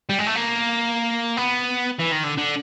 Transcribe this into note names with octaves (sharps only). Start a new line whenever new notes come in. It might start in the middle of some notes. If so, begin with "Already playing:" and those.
G3
G#3
A3
A#3
B3
E3
D#3
D3
D3